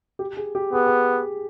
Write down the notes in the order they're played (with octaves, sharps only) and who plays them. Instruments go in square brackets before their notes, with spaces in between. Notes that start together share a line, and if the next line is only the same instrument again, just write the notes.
[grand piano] G4
G#4
G4
[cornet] B3 [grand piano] G#4
[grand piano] G#4